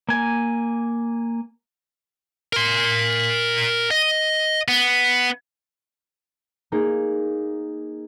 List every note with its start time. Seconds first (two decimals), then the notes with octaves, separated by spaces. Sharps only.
0.09 A#3 G#5
2.53 A#4 C6
3.91 D#5
4.68 B3
6.72 A#3 D#4 G#4